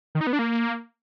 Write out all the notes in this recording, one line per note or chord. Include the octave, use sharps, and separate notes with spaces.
D#3
D#4
B3
D4
A#3